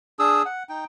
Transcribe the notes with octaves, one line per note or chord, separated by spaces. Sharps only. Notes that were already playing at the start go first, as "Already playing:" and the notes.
D4 G#4 D#6 E6
F#5
D#4 G5